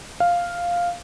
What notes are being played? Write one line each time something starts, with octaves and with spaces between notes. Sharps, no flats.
F5